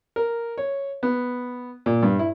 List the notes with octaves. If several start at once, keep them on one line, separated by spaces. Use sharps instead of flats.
A#4
C#5
B3
A#2
G2
E4